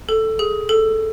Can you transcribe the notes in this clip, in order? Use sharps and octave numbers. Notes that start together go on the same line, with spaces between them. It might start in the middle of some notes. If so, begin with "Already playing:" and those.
A4
G#4
A4